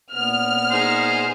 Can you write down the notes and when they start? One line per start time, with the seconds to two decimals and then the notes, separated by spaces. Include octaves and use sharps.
0.14 A#2 B3 F6
0.71 D#4 G#4 C5